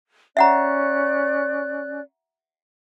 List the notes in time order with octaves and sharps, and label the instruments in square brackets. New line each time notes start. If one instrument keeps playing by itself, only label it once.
[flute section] C#4 D5 F#6 [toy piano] E5 F#5 A#5